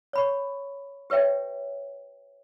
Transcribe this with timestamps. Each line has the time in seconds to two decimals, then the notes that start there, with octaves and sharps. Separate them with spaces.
0.13 C#5 B5 C#6
1.10 G4 B4 C#5 E5 G5